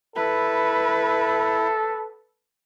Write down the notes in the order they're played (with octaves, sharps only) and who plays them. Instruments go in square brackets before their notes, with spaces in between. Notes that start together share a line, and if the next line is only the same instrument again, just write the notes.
[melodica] E4 [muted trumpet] A4 [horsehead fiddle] B4